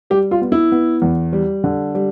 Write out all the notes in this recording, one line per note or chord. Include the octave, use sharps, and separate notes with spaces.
G3 G4
F4
B3
E4
B3
E2
G3
D3
G3